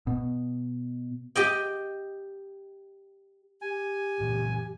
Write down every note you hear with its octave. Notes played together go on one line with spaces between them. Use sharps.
B2
G4 D#5 G5
G4 G#5
F#2 A#2 E3